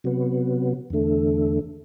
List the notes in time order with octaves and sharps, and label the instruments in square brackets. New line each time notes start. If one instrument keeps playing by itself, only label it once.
[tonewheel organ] C3 F#3 B3
E2 D3 A3